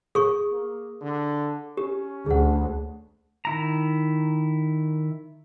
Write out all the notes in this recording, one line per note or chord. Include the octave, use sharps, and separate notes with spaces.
G#4 C#6 D#6
A#3
D3
C#4 G4
D2 G#4 F#5
D#3 E4 A#5